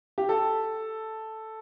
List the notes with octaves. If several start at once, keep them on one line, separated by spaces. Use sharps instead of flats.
G4
A4